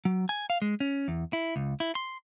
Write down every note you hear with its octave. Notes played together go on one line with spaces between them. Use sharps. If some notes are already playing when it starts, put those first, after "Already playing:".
F#3
G#5
F5
G#3
C#4
E2
E4
C#2
E4
C6